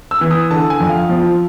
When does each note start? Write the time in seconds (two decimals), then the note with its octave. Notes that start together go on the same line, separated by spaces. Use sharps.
0.11 E6
0.21 E3
0.31 D#6
0.51 D3 A5
0.70 G#5
0.80 F2
0.90 F5
1.09 F3